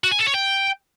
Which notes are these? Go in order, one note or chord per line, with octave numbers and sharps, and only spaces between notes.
F#4
G#5
A4
C#5
G5